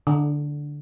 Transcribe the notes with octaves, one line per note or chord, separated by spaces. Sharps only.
D3